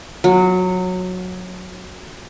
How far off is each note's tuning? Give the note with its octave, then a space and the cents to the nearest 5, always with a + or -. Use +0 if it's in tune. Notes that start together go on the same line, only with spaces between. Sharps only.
F#3 -15